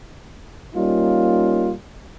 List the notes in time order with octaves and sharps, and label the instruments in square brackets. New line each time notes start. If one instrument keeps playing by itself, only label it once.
[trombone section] G3 A#3 C#4 D#4 F4